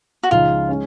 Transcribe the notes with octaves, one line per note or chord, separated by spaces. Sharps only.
F#4
C#2 C#3 F3 G#3 D#4 F4
G#3 C#4